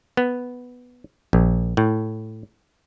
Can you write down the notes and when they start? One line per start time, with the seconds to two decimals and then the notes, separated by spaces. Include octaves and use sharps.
0.17 B3
1.33 A#1
1.77 A2